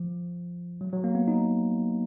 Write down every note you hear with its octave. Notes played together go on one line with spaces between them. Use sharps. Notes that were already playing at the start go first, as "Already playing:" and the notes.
Already playing: F3
F#3
F#3
A#3
B3
D#4